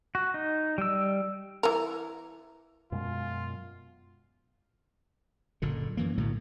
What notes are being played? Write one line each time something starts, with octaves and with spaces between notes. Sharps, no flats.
F#4
D#4
G3 E6
E3 A#4
F#2 B2 G#3 F4
F#1 A#2 D3
F#2 E3 A#3
B1 A2 D3 F#3